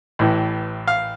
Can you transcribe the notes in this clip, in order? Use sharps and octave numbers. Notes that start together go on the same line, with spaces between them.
A1 A2 E3
F5